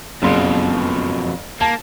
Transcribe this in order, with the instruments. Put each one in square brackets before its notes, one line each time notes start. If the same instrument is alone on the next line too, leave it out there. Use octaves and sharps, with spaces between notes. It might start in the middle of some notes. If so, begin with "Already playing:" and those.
[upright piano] F#1 C6 [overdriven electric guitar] F2 B2
[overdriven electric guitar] A#3 [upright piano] A5